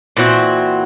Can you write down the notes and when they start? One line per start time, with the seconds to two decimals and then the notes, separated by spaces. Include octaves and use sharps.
0.17 A#2 E3 C4 F#4